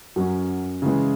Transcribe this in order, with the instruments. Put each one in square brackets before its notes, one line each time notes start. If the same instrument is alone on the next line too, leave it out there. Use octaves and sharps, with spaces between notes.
[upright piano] F#2 F#3 C#4
C#3 E3 G#3